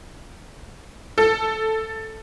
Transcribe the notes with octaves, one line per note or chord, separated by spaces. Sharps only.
A4